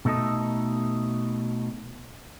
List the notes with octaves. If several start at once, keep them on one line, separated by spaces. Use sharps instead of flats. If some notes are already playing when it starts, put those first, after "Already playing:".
B2 A3 D#4 A4 D#5